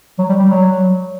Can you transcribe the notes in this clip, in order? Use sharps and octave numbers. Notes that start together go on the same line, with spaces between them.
F#3
G3
G3
F#3